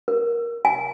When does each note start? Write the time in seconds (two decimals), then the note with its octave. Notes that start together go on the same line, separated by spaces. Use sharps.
0.08 A#4
0.65 G#5